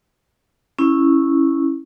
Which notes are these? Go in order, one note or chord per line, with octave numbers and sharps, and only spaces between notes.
C#4 E4